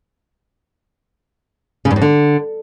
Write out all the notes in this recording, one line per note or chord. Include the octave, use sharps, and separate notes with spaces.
C#3
G2
F2
D3